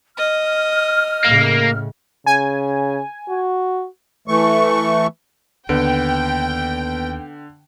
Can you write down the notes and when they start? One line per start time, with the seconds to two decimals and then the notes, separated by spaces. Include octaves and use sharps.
0.17 D#5 F6
1.25 A2 C#3 A#3
2.26 C#3 G#5
3.29 F#4
4.28 E3 A3 C#6
5.69 D#2 D3 B3 B4 G5 D7